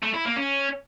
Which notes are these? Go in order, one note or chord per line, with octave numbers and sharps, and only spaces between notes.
A3
E4
A#3
C#4